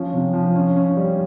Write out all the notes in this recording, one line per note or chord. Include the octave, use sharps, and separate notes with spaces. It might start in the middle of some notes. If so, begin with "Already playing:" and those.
Already playing: F3 C#4
C3
F3
C#4
C#4
G3